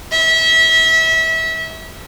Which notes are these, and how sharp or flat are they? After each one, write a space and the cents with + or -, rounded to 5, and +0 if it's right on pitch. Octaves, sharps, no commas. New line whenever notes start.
E5 -30